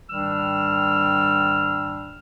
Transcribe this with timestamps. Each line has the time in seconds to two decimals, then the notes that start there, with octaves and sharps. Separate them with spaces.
0.10 G#2 D#3 G3 D4 E6 F6